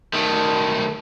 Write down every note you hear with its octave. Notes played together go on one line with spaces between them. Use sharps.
D#3 A3